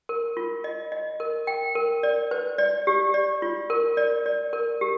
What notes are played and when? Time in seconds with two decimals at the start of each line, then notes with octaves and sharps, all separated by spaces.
0.09 A#4
0.37 F4
0.64 D#5
0.92 D#5
1.20 A#4
1.47 G5
1.75 A#4
2.03 D5
2.31 B4
2.58 D5
2.87 G4
3.14 D5
3.42 F4
3.70 A#4
3.97 D5
4.26 D5
4.53 A#4
4.81 G4